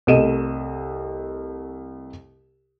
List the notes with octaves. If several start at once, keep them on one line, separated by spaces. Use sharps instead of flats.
C2 A3 D#5 D#7 E7